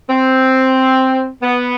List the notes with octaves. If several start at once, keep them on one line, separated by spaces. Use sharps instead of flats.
C4
B3